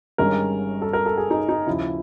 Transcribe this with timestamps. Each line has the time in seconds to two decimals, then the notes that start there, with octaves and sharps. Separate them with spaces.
0.18 G1 G2 D#3 G#3 C#4 A#4
0.82 A4
0.93 A#4
1.06 A4
1.17 G#4
1.31 D#4
1.49 D#4
1.67 D#2 C#3 F3 E4